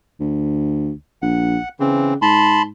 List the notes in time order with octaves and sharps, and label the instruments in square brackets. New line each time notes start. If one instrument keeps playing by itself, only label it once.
[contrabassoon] D2
[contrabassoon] A#1 [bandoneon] F#5
[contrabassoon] C#3 [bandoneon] E3 C4
[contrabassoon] G#2 [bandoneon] A5 B5 C6